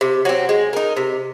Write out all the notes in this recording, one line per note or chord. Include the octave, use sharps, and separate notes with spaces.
C3
F#3 C4
G#3
D#4 A#4
C3